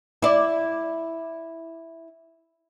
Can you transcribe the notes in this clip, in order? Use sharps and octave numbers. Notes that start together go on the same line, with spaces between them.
E4 D5